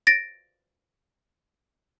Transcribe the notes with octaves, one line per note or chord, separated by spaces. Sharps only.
A6 A#6 D7